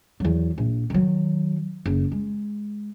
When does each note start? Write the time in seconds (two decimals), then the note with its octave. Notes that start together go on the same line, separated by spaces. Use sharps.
0.20 E2 F#3
0.58 A#1
0.90 D#3 F#3
1.86 F#1
2.12 G#3